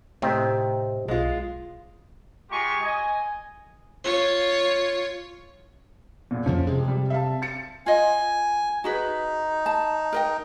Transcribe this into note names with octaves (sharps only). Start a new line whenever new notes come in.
A2 C3 C4 D#4
B1 G#3 F4
G#3 F4 G4 G#5 A#5 C#6
D#5 G#5
F4 C#5
E2 A#2
F2 C#3 F3 C#4
C3 G#3
G3
E5 F5 A5
A6 C#7
F4 D#5 G#5
D#4 F#4 G#4 B4
A5
A#4 D#5 G5